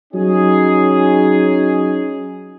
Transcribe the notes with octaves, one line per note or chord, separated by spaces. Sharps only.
F#3 C#4 D#4 G#4